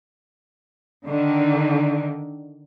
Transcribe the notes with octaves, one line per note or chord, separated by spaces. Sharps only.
D3 D#3